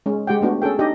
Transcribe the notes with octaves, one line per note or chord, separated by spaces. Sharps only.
G#3 C#4
G#3 G4 F#5 G5
A3 B3 D4 F#4
C#4 G#4 A4 G5
D4 D#4 G4 D#5